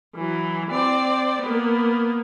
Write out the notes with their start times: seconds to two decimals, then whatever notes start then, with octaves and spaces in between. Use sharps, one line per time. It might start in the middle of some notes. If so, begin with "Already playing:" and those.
0.15 E3 F#3
0.71 C4 D5
1.42 A#3 B3